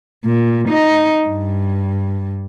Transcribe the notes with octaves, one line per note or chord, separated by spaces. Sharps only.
A#2
D#4
G2